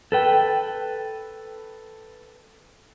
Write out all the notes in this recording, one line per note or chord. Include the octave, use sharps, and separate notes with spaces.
A4 B4 G5